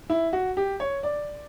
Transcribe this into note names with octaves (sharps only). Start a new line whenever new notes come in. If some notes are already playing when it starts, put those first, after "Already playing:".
E4
F#4
G4
C#5
D5